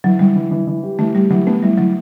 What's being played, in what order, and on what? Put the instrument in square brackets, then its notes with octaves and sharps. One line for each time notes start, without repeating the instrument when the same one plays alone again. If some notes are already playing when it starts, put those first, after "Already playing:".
[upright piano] E3 [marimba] F#3
[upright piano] E3 [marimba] G3
[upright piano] E3
E3
E3
G4
[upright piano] E3 [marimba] A3
[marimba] G3 [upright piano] G4
[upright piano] E3 [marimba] F#3
[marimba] A3 [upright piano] B3
[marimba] G3 [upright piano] E4
[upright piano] E3 [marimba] F#3